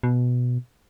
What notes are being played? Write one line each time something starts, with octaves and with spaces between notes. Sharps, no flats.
B2